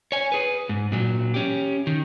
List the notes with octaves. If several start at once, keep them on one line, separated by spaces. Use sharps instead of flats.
C#5 G#5
G#4 B4
G#2
A#2 F#3
C#4 G4
D#3